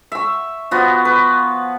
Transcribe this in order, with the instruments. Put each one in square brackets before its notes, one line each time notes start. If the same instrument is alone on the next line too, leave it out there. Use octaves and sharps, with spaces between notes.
[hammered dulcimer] E5 C#6
F3 B3 F#4
B4